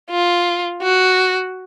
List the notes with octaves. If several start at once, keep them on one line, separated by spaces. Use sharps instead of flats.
F4
F#4